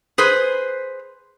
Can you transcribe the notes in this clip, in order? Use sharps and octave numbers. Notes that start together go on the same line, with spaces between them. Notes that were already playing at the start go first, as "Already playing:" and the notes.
G#4 B4 C5